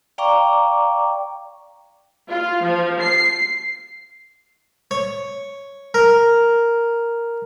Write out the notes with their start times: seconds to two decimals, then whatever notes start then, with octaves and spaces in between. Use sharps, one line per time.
0.18 D5 F5 G5 A#5 C#6 D6
2.28 F4
2.63 F3
3.00 C7
4.91 C#5
5.94 A#4